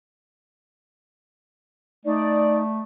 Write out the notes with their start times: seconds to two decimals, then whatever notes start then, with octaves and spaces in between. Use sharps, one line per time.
2.05 A3 D#4 D5